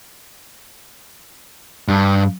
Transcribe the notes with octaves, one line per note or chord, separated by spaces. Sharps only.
G2